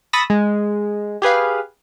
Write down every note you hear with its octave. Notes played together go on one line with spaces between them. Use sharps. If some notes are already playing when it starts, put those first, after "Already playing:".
A5 B5 C#6 D#6 E6 A#6
G#3
G4 G#4 B4 F5